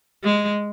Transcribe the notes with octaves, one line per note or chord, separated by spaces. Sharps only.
G#3